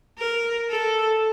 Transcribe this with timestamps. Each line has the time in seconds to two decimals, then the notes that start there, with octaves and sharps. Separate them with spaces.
0.18 A#4
0.70 A4